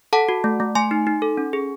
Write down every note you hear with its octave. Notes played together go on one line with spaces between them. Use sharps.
A4 F#5 A5
F#4
A3
A3
A3 G#5 C6
D#4
D#4
A4
C#4
G#4